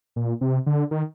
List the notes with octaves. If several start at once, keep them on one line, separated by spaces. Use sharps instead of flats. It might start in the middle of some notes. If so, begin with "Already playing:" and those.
A#2
C3
D3
D#3